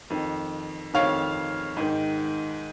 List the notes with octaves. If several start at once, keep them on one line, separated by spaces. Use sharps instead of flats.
F2 D#3
F2 D#3 C#5 F5
G#2 D#3